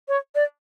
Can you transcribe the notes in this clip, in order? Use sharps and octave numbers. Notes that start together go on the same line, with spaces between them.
C#5
D5